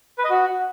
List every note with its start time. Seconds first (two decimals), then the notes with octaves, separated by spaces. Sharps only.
0.18 B4
0.24 D#5
0.30 F#4